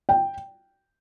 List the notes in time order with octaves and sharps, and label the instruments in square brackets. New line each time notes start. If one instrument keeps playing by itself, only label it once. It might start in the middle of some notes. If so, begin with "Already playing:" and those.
[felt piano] G5